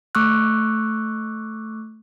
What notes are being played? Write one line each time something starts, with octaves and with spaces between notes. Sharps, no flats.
A3 C#6 D6 E6 F#6